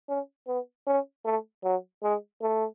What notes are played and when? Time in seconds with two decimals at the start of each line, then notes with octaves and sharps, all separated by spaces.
0.08 C#4
0.47 B3
0.87 C#4
1.25 A3
1.64 F#3
2.03 G#3
2.42 A3